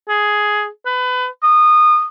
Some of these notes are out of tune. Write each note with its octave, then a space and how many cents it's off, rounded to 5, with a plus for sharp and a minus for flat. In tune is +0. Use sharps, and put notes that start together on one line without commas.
G#4 +10
B4 +25
D#6 -25